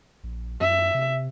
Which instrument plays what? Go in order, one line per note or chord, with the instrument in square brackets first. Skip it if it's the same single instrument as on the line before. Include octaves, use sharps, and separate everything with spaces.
[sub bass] A#1
[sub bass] F#2 [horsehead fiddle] E5
[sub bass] C3